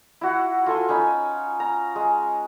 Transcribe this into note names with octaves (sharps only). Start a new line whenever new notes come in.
E4 F#4 F#5
F4 A4 G#5 C6
C#4 D#4 G#5 B5
A#5
G#3